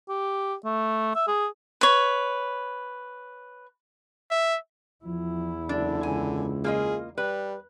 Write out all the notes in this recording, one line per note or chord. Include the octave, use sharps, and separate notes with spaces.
G4
A3
E5
G#4
B4 C#5
E5
E2 F3 E4
F#1 D3 D4
C#2 G#5
A#3 F4 G#4 D#5
G3 B4